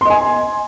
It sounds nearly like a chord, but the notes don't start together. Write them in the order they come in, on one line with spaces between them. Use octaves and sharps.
C6 D#5 G#5